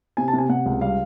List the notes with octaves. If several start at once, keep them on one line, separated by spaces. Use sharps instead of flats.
C3 G#5
A5
C3
G#5
C3 F#5
C#2
G3 F5